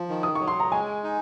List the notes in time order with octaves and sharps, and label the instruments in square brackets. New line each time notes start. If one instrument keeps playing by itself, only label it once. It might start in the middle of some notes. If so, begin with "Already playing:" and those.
Already playing: [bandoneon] F3
D#3
[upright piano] D#6
[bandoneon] F#3 [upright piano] C#6
[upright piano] C6
A#5
[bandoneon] G#3 [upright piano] G#5
[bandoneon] D#4